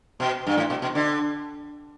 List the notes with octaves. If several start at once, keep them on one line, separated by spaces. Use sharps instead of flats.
B2
G2
A2
B2
B2
D3